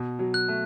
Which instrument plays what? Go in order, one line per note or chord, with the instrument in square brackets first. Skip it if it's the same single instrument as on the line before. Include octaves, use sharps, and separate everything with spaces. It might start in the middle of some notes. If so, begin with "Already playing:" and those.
Already playing: [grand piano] B2
F#3
[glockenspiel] F#6
[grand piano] A3